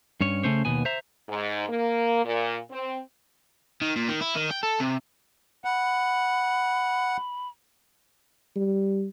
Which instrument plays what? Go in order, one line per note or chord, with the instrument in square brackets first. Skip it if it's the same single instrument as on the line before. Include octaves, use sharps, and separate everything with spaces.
[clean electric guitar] G2 C#4 C#5
C#3 E3 A3 C#4 C5 C#5
D#2 B2 B3 G#5
C5 E5 A#5
[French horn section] G#2
A#3
A#2
C4
[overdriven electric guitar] D#3
A#2
D#3
E4
D#3
G5
A4
C3
[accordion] F#5 [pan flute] B5
[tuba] G3